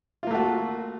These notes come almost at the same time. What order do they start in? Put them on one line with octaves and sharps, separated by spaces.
F4 A#3 A3 F#4